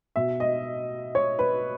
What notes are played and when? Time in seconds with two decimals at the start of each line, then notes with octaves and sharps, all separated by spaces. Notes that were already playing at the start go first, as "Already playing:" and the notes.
0.16 B2 E5
0.40 D#5
1.15 C#5
1.39 B4